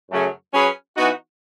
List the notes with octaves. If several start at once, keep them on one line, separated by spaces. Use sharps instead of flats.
F#2 C#3 F#3 A3 C#4
F#3 C#4 G#4 B4
E3 B3 D#4 F#4